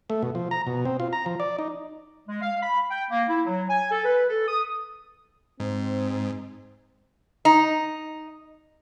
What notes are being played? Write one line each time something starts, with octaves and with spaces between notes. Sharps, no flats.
A3
B2
F3
A#5
B2
C4
F4
A#5
F3
D5
D#4
G#3
F5
B5
G5
A#3
E4
F#3
G#5
A4
B4
A4
D#6
G#2 C4
D#4